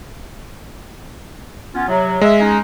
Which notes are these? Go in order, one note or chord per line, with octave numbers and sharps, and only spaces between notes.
B3 C#4 F4
C3 F#3
G#3 E5
C#4 D#4